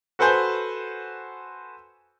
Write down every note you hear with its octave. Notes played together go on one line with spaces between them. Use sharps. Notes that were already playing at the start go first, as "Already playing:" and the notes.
F#4 A4 B4 C5 G#5 G6